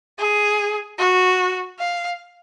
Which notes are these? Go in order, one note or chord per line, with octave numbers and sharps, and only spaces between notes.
G#4
F#4
F5